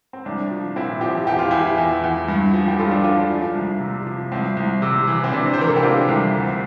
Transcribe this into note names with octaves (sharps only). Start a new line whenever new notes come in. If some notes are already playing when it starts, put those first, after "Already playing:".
C4
C2 D4
F3
A#2 C4 E4
F3 E4 G4
E2 G4
F4
E2 E4 G4
E2
E2
G2
F3
G4
G2 F4 A4
D4 F4
F3 D4 F4
D4
F3
C2
C3
F3
C2 C4
C2
C3
E3
C4
C3 D4
C5
E3 A#4
A4
G4
C3 D4 F4
C2
D2